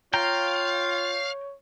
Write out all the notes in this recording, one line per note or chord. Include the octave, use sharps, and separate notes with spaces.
F4 C#5 F5 G5 A#5